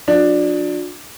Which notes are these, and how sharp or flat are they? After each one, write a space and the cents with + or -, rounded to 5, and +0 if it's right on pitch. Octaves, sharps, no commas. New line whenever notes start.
F#3 -45 D4 +10